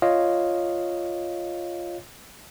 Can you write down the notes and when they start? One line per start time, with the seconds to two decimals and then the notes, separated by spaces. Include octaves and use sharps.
0.02 F4 C#5 D#5 F5